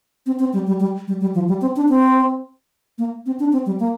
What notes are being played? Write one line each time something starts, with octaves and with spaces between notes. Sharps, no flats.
C4
C4
G3
G3
G3
G3
G3
F3
G3
C4
D4
C4
A#3
C4
D4
C4
G3
A#3